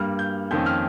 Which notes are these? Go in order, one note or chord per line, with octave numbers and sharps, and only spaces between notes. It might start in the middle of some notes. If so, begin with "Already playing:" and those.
Already playing: G2 G3 A#3 F6
G6
F2 D#3 A#3 C#4 G6
F6